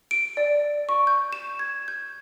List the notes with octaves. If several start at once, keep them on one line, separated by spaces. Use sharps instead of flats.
D7
D5
C#6
G6
E7
G#6
G6